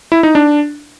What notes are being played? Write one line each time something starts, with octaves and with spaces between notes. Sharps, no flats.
E4
D#4
D4